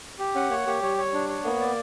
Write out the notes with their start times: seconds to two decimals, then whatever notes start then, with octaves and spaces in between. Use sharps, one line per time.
0.19 G4
0.35 C#4 F#5
0.50 A#3 C#5
0.66 A#3 G4
0.82 G3 C#5
0.97 C#5
1.14 D4
1.29 C#5
1.44 A#3 B3
1.60 D5